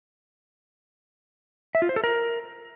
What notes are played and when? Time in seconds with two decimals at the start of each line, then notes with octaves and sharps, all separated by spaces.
1.75 E5
1.82 F4
1.89 C5
1.96 A4
2.04 A#4